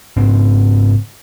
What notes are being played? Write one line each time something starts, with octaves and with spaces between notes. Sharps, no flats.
G#2 C#3 C4